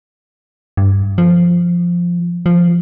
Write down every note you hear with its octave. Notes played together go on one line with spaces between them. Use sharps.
G2
F3
F3